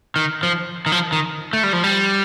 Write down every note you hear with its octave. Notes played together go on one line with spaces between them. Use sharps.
D#3
F3
D#3
F3
D#3
A3
G3
F3
G3